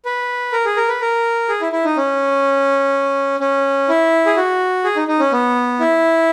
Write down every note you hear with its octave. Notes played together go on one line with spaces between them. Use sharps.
B4
A#4
G#4
A#4
B4
A#4
G#4
E4
E4
D#4
C#4
C#4
E4
G#4
F#4
G#4
D#4
D#4
C#4
B3
E4